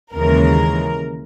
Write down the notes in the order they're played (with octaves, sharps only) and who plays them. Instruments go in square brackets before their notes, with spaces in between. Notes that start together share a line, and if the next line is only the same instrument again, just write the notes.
[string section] D#2 C#3 E3 G#3 A#4